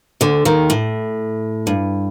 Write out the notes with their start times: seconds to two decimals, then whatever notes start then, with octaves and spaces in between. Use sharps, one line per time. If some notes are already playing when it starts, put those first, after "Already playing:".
0.21 D2 D3
0.45 D#2 D#3
0.70 A2
1.67 G2